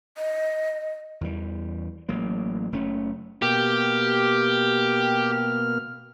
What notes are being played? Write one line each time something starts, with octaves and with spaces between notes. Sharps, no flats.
D#5
E2 E3 G3
A1 F#3 A#3
F#1 A3 C#4
B2 A#3 G4 F6